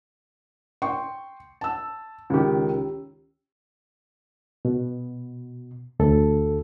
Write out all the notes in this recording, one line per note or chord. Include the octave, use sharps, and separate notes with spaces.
G5 C6 C#6
A5 E6
C#2 D#3 C#4 G4
B2
D2 A4